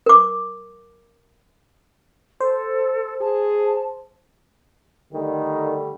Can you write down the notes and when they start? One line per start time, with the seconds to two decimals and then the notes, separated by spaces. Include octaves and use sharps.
0.06 A#4 D6
2.40 A4 C5
3.21 G#4 A5
5.13 D3 D#3 G3 A3